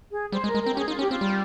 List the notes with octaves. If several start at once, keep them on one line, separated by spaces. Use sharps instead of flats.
G#4
G3 C5
G#3
A#4
G#3
C4 A#4
G4
C#4 G#4
D#4 F4
C#4 G4
C4 F4
G3